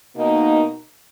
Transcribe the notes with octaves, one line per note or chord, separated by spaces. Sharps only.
B2 A#3 D#4